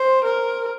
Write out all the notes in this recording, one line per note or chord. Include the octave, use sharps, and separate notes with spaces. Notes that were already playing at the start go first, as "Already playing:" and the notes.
Already playing: C5
A#4